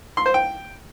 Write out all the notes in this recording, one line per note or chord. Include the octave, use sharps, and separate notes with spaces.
C6
C5
G5